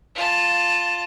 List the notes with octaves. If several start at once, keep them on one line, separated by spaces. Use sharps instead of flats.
F4 A5